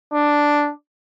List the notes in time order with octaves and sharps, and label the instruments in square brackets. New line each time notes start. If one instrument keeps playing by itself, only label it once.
[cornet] D4